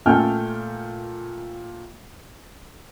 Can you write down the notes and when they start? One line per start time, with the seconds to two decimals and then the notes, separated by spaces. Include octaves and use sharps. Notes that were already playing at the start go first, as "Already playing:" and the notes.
0.06 A#2 A3 A4 G5 G#5 F6